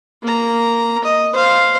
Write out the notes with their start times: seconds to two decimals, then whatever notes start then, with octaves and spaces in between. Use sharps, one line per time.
0.23 A#3 A#5
1.04 D#5
1.33 C5 F5